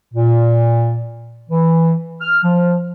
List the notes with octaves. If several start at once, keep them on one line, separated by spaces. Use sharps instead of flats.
A#2
E3
F6
F3